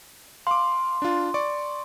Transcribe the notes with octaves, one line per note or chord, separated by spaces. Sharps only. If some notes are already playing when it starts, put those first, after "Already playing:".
F5 C6 D6
D4 F4
D5 C#6 D6